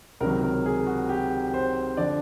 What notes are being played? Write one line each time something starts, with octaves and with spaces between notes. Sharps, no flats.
C#2 C3 D#3 F#3 A#4
A#4
G#4
F#4
G4
C5
D3 F3 D5